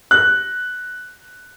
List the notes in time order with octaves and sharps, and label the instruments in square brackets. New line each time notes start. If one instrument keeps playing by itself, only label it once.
[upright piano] F#6